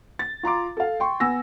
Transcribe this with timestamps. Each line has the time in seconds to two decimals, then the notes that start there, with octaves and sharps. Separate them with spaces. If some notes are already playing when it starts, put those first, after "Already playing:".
0.19 A6
0.43 F4 A#5 C6 D6
0.77 A4 F5
1.00 G5 C6 C#6
1.20 B3 G#5 E6 A#6